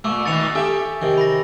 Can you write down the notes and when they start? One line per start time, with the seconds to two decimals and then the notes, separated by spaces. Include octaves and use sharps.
0.04 A#2 A3 C#6 D6 E6
0.25 B2 D#3 B3 A6 C#7 F7
0.55 G4 A4 E5 G#5
1.02 C3 D#3
1.18 B5 A#6